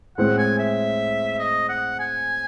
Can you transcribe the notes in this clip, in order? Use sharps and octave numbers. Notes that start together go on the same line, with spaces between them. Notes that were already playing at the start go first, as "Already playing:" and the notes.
A2 G#3 C4 F#5
G#5
E5
D#5
F#5
G#5